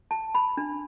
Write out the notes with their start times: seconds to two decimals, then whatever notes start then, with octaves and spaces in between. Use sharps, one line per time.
0.11 A5
0.35 B5
0.57 D4